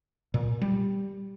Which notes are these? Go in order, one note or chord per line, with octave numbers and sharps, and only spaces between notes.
A#2
G3